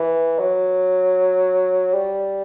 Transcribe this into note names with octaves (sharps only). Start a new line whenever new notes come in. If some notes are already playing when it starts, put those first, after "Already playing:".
Already playing: E3
F#3
G3